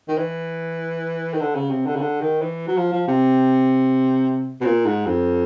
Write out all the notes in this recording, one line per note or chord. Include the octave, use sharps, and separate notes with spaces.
D#3
E3
D#3
D3
C#3
C3
D3
C#3
D3
D#3
E3
F#3
F3
F3
C3
B2
A#2
G#2
F2